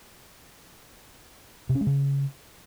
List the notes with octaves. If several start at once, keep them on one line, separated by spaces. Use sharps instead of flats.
C3
C#4
G#3
C#3